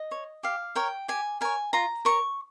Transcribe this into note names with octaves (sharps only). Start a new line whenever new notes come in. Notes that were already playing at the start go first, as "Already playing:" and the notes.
Already playing: D#5
C#5
G4 F5
A#4 C#5 G5
G4 G#5
A#4 C#5 G#5
F4 A#5
A#4 C#5 C#6